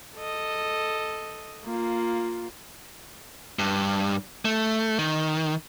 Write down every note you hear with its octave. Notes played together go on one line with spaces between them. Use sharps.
A4 D#5
A#3 F4
G2
A3
D#3